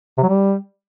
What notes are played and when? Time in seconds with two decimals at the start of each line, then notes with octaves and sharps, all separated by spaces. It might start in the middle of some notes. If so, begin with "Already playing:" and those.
0.18 C3
0.23 F#3
0.28 G3